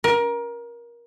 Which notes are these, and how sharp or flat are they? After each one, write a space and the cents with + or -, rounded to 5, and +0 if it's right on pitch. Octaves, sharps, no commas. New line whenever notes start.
A#4 +25